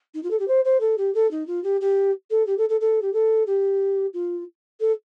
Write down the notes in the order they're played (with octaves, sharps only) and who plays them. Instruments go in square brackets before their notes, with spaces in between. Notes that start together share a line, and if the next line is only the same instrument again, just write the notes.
[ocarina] D#4
F4
A4
G4
C5
C5
A4
G4
A4
D#4
F4
G4
G4
A4
G4
A4
A4
A4
G4
A4
G4
F4
A4